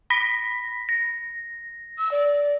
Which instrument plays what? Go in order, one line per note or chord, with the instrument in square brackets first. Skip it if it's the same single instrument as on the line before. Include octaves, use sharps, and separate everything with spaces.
[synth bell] B5 A#6 B6
A#6
[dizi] E6
D5